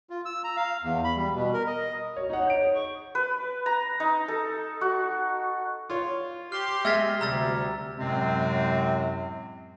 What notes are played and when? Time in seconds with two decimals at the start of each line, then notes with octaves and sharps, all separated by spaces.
0.10 F4
0.25 E6
0.44 A#5
0.57 F5
0.83 E2
1.04 B5
1.16 G3
1.35 B2
1.53 A#4
1.67 D#5
2.17 F#4 C#5
2.29 D#4 C#5 F#5
2.47 G6 D7
2.60 G#4
2.74 C#6
3.15 B4
3.66 A#5
4.00 D#4
4.28 A4
4.81 F#4
5.90 F4 C#5
6.52 G4 C6 F6
6.85 G#3 E5 E6 F6 G#6 A6 B6
7.21 D2 C3 G3 A#5 E6 A6
7.98 F#2 A2 C3 F#3 G#3 C4